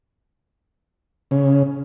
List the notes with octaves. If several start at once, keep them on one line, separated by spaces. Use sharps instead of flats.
C#3